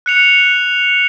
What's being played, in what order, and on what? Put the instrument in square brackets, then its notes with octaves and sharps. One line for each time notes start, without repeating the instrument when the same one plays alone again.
[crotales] F#6 C#7 F7